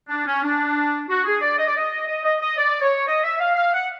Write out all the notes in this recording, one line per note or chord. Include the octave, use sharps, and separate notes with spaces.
D4
C#4
D4
F#4
G#4
D5
D#5
D5
D#5
D#5
D#5
D#5
D5
C#5
D#5
E5
F5
F5
F#5